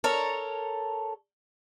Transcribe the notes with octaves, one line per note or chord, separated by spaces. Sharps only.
A4 A#4 C#5